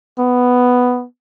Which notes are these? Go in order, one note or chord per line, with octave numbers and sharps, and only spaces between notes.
B3